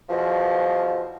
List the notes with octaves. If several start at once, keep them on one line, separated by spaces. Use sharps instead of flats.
E2 B2 F3